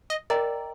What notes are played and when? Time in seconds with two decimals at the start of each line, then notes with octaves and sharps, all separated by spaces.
0.10 D#5
0.30 A#4 D5 D#5 G5 A#5